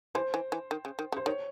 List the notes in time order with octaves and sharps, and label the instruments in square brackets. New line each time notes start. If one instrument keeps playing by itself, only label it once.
[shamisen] E3 [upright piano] C5
[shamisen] E3
E3
D#3
C#3
D#3
C#3
[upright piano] C5
[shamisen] D#3 [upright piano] C#5